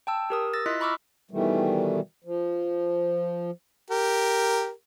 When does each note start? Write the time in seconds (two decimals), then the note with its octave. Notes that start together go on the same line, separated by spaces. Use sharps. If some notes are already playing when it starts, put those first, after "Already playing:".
0.07 G5 A5 E6
0.30 G4 A#4 D#6
0.53 E6 A6 A#6
0.66 E4 F4 D#5 C6 F#6 B6
0.80 A#5 B5 C#6 D6 E6 F6
1.31 B2 D#3 E3 G3 A3
2.24 F3
3.90 G4 A#4